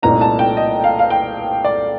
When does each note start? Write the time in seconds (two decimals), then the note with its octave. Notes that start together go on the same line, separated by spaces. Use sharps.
0.02 C2 A#2 A3 C4 D#4 A#5
0.21 A5
0.39 G5
0.57 D#5
0.84 F5
0.99 F5
1.10 G5
1.64 D5